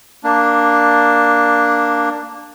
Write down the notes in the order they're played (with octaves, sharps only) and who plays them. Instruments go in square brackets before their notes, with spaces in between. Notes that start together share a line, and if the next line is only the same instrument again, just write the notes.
[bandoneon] A#3 D4